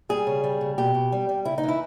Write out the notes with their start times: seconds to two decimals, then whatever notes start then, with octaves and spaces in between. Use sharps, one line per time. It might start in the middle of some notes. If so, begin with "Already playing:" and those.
0.09 G3 G#4
0.27 C#3
0.44 G3
0.61 C#3
0.78 B2 G4
0.94 B2
1.12 G3
1.29 G3
1.45 C#3 E4
1.58 D#4
1.63 E3
1.68 E4